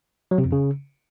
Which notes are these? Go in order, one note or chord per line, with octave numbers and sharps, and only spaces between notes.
F#3
C3
F2
C#3